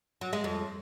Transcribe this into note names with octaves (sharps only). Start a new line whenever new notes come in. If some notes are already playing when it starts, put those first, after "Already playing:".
F#3
G#3
F2